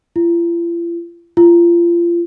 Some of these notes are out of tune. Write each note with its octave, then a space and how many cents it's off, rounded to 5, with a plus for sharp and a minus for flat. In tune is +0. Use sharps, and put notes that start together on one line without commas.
F4 -45
F4 -30